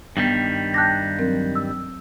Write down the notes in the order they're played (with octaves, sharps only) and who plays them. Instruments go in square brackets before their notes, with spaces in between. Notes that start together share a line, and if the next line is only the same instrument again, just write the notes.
[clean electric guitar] G2 D#3 G3 [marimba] B3
[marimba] G5 A5 D6 [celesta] F#6 G6 A#6
[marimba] F#3 C4 A#4
[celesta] E6